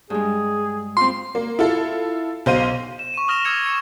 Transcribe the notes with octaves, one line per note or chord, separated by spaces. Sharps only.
G2 G#3 G#4
C4 F4 C6
A#3
E4 F4 A4
B1 C5 F5 D#7
E7
C#6 D#7
D#6 F6 A#6 E7 F7
D6 E6 G#6 C#7 F7
C#7 E7